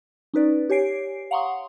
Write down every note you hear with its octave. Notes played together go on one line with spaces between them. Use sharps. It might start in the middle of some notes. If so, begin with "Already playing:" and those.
C#4 D#4 B4 D5
G4 C#5 G#5 C7 D7
F5 F#5 A#5 C6 C#6 D#6